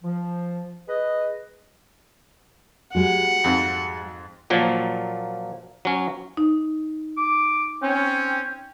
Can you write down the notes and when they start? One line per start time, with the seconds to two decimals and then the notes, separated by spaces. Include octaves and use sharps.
0.03 F3
0.88 G#4 B4 D#5
2.95 G3 G#3 F#4 F#5
3.44 F2 G#2
4.50 A#2 F3 F#3 A#3
5.85 F#3 C#4
6.37 D#4
7.17 D6
7.83 C4 C#4 G5